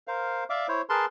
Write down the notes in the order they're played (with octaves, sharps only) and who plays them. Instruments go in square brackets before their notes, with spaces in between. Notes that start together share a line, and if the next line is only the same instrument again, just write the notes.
[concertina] A#4 C5 F5
D5 E5 F5 D6
E4 C5 C#5
G#4 A#4 B4 A5 C6